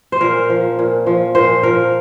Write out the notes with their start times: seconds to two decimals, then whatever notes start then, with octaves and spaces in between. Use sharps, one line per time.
0.12 C5
0.21 A#2 A#4
0.50 F3
0.79 A#2
1.07 F3
1.35 A#2 C5
1.63 F3 A#4